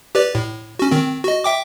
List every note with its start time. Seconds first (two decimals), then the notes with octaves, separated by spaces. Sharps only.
0.15 G4 B4 D5
0.35 A2
0.79 C#4 F#4
0.91 D#3 C4
1.24 F#4 D#5
1.44 E5 G5 D6